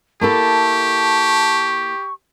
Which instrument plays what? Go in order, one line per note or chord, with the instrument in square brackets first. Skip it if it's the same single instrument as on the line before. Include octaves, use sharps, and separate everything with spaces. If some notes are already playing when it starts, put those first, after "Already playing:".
[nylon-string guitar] A#3 E4 A4 [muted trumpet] G4 [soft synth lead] A5 [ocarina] C#6